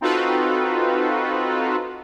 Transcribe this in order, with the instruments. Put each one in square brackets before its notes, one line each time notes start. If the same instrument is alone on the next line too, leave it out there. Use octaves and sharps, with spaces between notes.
[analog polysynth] C4 D#4 F4 F#4 A4 B4